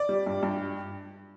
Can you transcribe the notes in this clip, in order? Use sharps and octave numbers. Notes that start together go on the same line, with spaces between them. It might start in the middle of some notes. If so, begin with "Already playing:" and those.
Already playing: D5
G3
G2
G2